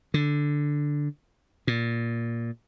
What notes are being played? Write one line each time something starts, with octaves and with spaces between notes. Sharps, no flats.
D3
A#2